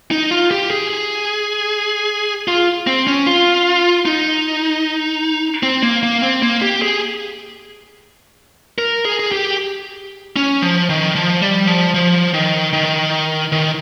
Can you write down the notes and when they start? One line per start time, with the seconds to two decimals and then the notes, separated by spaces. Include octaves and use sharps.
0.11 D#4
0.31 F4
0.51 G4
0.70 G#4
0.90 G#4
2.48 F4
2.87 C4
3.07 C#4
3.26 F4
4.06 D#4
5.63 C4
5.83 A#3
6.03 A#3
6.22 C4
6.42 A#3
6.62 G4
6.82 G#4
8.78 A#4
9.05 G#4
9.19 G#4
9.32 G4
10.36 C#4
10.62 F3
10.90 D#3
11.15 F3
11.42 G3
11.67 F3
11.94 F3
12.34 D#3
12.73 D#3
13.52 D#3